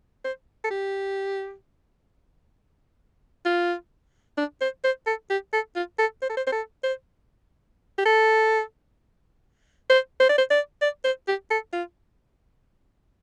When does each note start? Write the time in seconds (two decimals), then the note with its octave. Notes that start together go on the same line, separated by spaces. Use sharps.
0.24 C5
0.64 A4
0.70 G4
3.46 F4
4.37 D4
4.61 C5
4.84 C5
5.07 A4
5.30 G4
5.53 A4
5.76 F4
5.99 A4
6.22 C5
6.29 A4
6.37 C5
6.47 C5
6.52 A4
6.83 C5
7.98 G4
8.05 A4
9.89 C5
10.20 C5
10.29 D5
10.38 C5
10.50 D5
10.81 D5
11.04 C5
11.28 G4
11.51 A4
11.73 F4